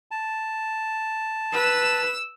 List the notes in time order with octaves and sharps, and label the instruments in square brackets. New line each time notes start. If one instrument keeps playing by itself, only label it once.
[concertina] A5
[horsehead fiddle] B4 [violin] E6 E7